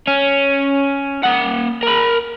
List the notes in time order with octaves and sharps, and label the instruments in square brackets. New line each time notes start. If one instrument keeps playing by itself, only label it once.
[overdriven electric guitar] C#4
A#3 F#5
A#4 B5